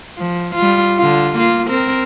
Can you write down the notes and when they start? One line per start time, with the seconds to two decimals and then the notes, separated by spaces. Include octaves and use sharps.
0.18 F3
0.56 G3 F4
0.97 D3 F4
1.37 A#3 F4
1.68 C4 A#4